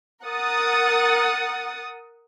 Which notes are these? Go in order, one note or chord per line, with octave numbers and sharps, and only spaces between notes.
A#4 F#5 D#6 A6